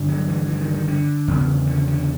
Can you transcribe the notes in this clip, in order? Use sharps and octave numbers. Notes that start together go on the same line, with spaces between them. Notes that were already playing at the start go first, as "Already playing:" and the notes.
Already playing: G2 D3
F#3
E3
E3
D#3
D#3
D3
E2 C#3
D3
D3